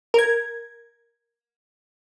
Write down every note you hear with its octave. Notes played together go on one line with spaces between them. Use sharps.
A#4 G#6